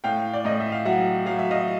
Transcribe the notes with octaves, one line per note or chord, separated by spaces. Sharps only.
A2 F5 G5
D5
A2 D#5
E5
F5
F#3 E5 F#5
F#3 F5
E5
D#5 F5